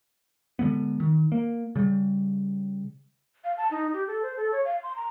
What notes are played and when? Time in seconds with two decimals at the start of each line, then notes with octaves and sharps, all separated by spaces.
0.59 D3 D#3 G#3 B3
1.00 D#3
1.32 A#3
1.75 C#3 G3
3.44 F5
3.57 A5
3.71 D#4
3.94 G4
4.07 A4
4.23 C5
4.36 A4
4.52 C#5
4.65 F5
4.83 C6
4.96 A#5